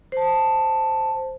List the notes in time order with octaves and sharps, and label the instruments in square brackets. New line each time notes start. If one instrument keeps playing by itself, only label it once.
[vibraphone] C5 A5